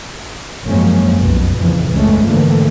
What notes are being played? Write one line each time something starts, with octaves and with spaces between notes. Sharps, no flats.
G#1 F#2 F3 G#3 A#3 C#4
F1 B1 B2
A#1 F2 A#2 C#3 E3 F3
F#1 C#2 G#2 G#3 A3 C#4
G#2 D3 E3 F3 A3 A#3